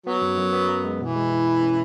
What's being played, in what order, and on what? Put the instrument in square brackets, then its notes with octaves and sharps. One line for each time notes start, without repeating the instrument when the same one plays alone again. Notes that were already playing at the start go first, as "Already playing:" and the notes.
[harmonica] F#3 [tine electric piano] B3
[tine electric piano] F#2
F#2
B3
F#2
G#3
[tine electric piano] B2 [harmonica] E3
[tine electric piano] G#3
E4
E4
C#4